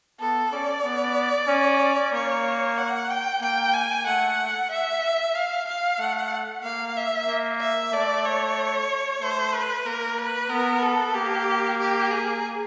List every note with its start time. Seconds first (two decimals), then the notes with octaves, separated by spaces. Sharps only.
0.20 B3 A4
0.52 C#4 D5
0.84 B3
1.48 C#4
2.13 A#3 C#5
2.78 F#5
3.10 G5
3.41 A#3 G5
3.73 G#5
4.06 A3 F#5
4.71 E5
5.35 F5
5.68 F5
5.99 A3 F#5
6.63 A#3 F5
6.97 E5
7.28 A#3
7.60 E5
7.92 A3 D5
8.24 C#5
9.21 A3 C5
9.53 B4
9.86 A#3 A#4
10.18 B4
10.50 B3 A#4
10.82 A4
11.15 A#3 G4
11.79 G4
12.10 G#4